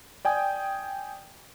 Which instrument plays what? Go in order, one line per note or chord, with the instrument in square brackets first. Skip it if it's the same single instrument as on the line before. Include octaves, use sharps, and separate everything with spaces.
[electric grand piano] D5 G5 G#5 D#6